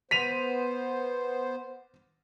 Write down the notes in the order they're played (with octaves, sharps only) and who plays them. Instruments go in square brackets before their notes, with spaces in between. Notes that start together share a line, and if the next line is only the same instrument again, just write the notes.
[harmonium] B3 C5 [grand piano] B6 D#7 F7